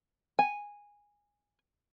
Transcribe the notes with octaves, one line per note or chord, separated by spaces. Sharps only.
G#5